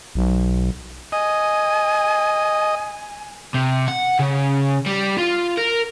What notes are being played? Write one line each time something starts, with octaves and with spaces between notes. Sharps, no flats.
B1
D#5 G#5
C3
F#5
C#3
G3
F4
A#4